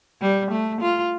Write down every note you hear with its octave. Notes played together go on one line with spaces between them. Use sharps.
G3
A3
F4